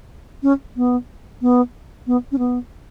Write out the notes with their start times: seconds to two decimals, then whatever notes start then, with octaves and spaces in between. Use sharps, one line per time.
0.43 C#4
0.76 B3
1.41 B3
2.07 B3
2.32 C#4
2.38 B3